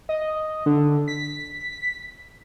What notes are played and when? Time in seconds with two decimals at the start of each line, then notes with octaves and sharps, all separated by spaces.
0.09 D#5
0.66 D3
1.08 B6